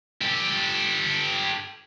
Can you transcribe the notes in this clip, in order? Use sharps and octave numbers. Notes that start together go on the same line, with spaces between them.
G4 A4